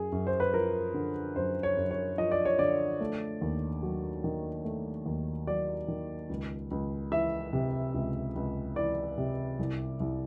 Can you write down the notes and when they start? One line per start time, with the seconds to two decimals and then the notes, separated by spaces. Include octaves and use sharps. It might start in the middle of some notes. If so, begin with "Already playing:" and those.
Already playing: F#2 G#4
0.12 F#2
0.27 C5
0.40 B4
0.54 F3 A#4
0.94 D3
1.36 F#2 C5
1.63 C#5
1.77 F#2
1.91 C#5
2.18 F3 D#5
2.31 D5
2.45 C#5
2.59 D3 D5
3.01 A3
3.41 D#2
3.83 F#3
4.24 D#3
4.65 A3
5.06 D#2
5.47 F#3 D5
5.88 D#3
6.29 C#2
6.71 C#2
7.12 E3 E5
7.53 C3
7.94 C#2
8.36 C#2
8.76 E3 D5
9.18 C3
9.59 C2
10.00 C2